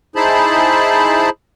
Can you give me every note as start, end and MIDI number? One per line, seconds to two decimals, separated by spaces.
0.16 1.30 63
0.16 1.30 64
0.16 1.30 68
0.16 1.30 72
0.16 1.30 81
0.16 1.30 83